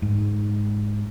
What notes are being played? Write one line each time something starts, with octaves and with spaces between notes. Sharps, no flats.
G#2